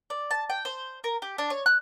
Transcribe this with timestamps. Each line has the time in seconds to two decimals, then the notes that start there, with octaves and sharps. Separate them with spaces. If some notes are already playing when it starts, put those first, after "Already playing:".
0.10 D5
0.31 A5
0.50 G5
0.65 C5
1.04 A#4
1.22 G4
1.38 D4
1.50 C#5
1.66 F#6